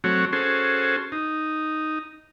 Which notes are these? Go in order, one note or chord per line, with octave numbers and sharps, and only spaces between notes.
F#3 A3 C4 F#4 C#5
C#4 F#4 G#4 A4 C5
D#4